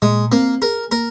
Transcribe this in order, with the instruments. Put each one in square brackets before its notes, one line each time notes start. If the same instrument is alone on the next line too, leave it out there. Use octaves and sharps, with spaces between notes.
[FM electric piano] A#2 [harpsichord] G#3
[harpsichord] A#3 [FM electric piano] C4
[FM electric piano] G#4 [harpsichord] A#4
[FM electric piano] A#3 [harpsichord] A#4